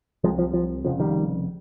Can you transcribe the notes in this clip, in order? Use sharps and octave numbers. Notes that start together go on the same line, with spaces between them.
C2 C3 F3 G#3
F3
F3
F1 F2 C#3 F3
D#3 G3